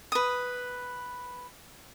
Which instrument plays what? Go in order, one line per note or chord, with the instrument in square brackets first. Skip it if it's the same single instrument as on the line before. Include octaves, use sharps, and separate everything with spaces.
[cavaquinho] B4 D#6